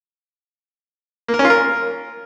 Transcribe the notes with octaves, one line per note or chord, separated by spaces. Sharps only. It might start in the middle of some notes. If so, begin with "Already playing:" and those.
A#3
A#4
C#4
F4
A#4